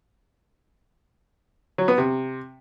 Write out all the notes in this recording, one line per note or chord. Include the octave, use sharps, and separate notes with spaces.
F#3
B3
C3